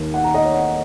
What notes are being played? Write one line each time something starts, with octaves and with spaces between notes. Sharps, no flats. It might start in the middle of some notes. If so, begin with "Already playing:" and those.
Already playing: D#2
F#5
A#5
D#5
C#5
F#5